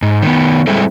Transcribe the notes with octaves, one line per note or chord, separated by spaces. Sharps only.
G#2
D#3 B3
G3 G#3 C4 E4 A4